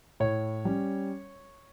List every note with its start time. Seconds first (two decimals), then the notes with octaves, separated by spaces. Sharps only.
0.20 A2 C#5
0.65 G3 C#4